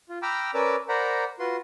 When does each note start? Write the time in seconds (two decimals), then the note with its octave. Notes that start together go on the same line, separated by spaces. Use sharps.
0.09 F4
0.22 G5 A#5 B5 D6 E6 F6
0.54 C#4 A#4 B4 D5 D6 E6
0.89 A#4 C5 D5 F#5 A#5 B5
1.39 F4 F#4 B4 C6